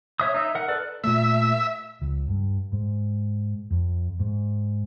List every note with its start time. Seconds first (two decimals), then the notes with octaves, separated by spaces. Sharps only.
0.20 C#5 E5 D#6
0.34 D#4 E5
0.55 A#4 F#5
0.68 A4 B4 D5
1.04 A#2 A3 E5
2.01 C#2
2.28 G2
2.72 G#2
3.70 F2
4.19 G#2